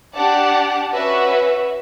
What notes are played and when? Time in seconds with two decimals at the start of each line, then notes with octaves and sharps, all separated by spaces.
0.15 D4 G4 D5 F#5 A5
0.92 C#4 F#4 B4 E5